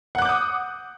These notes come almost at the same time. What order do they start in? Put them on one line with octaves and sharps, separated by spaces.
F#5 F#6 D6 G6 D#6